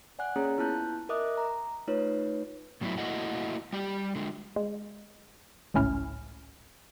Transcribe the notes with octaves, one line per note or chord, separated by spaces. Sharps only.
D5 F#5 G#5 F#6
A#3 C#4 G#4 C#5 A#5
B3 E4 F4 A5 F#6 G6
A#4 D#5 E5 D6 D#6 F#6
A#5
A3 D#4 F4 B4 C#5
A2 F#3 B3 C#4 E4
A3 A#3 E4 F#4 D#5 F#5
G3 G4
D3 G#3
G#3
G#1 C#2 A2 C#4 E4 F6